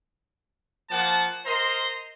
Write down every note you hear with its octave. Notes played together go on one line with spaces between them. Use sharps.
F3 A#3 F#5 A5
A#4 C5 D#5 A#5 C6